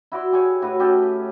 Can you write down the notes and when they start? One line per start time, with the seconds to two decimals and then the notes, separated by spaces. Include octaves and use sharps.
0.12 E4 F#4 D5 C6
0.32 G4 G#4 C#5
0.62 A2 F#4 B4 C#5
0.79 C#4 G4 A4 D#5